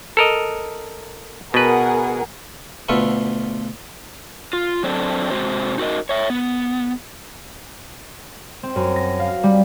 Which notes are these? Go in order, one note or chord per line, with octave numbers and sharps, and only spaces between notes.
A4 A#4 D#5
B2 G#4 A#4 B4 F#5
D2 B2 F4 A4 B4 C#6
F4
F#3 C4 D4 A4 C5
C3 D#3 G#3 C4 F#4 C5
D#4 F#4 A#4 D#5
C#5 E5
B3
C4
F#2
A#6
F5
G3